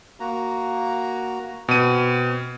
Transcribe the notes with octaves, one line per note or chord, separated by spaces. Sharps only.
A#3 F#4 A#5
B2 C4 D#7